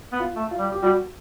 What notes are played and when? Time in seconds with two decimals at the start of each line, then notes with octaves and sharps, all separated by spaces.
0.12 B3
0.20 F4
0.36 A3
0.51 F4
0.59 G3
0.72 G4
0.83 G3 F#4